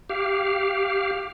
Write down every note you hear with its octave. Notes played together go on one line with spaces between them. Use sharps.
G4 F5